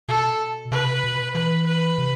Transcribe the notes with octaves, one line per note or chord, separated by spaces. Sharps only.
B2 A4
C3 B4
B2
E3 B4
B4
C3